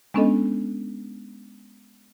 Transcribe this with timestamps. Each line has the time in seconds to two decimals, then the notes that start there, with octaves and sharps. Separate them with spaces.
0.14 G#3 B3 C#4 D4 A4 D#5